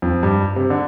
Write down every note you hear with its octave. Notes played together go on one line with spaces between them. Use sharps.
F2
G2
C3
D3